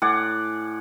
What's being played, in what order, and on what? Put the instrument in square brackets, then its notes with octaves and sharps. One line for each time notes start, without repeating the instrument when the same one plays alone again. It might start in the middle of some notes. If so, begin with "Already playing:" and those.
[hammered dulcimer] A2 D5 F#5 G#5